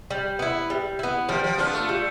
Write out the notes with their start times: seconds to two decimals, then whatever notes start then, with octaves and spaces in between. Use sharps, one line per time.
0.11 G3
0.39 B3 E4
0.70 G3
0.99 B3 E4
1.29 F3 G3
1.44 F3
1.58 B3 D4 F4
1.73 A3
1.89 G3